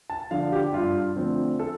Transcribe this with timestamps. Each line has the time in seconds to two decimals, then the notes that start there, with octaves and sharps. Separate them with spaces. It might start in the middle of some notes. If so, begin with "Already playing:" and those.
0.10 A5
0.31 D3 F3 F5
0.52 G4
0.73 G2 F4
1.16 D3 F3 A3 C4
1.60 A4